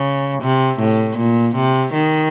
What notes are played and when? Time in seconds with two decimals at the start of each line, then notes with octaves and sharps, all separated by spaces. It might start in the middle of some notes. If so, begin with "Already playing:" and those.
Already playing: C#3
0.42 C3
0.79 A2
1.17 A#2
1.55 C3
1.93 D#3